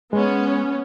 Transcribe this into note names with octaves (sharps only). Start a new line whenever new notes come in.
G#3 B3 C#4